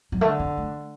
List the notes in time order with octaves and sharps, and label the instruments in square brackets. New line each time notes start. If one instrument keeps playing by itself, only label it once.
[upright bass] F#3
[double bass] D3 [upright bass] A3
[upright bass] B3
A3